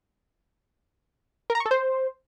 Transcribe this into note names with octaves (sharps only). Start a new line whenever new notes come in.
A#4
A#5
C#6
A4
C5